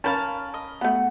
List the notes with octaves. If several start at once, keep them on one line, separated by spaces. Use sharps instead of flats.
C#4 A#4 F5 G5 A5 B5
D#5
A3 B3 F#5